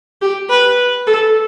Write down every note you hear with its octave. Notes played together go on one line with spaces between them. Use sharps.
G4
B4
A4